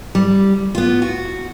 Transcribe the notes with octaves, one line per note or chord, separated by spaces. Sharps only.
G3
B3 F4
F#4